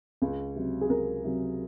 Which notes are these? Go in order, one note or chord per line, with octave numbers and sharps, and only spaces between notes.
C#2
C3 F#3
G#4
C#2 A#4
C3 F#3